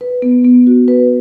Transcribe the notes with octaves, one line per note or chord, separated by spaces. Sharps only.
B4
B3
B3
F#4
B4